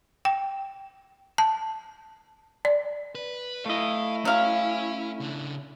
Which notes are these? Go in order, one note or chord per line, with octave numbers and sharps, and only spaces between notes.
G5
A5
D5
B4
A3 E4 D#5 F5
F#3 C#4 F5 G#5
C#3 D4